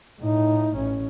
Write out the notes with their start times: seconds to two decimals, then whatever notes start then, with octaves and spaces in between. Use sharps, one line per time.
0.20 A2 D#4
0.76 A1 C#4